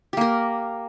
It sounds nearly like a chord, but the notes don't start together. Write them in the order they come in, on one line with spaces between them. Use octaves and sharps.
G4 A#3 A#4